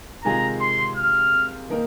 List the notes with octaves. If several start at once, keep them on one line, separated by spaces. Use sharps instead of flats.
C3 D#3 G#3 F4 G#4 A#5
C6
F6
D#3 A#3 D#4 A#4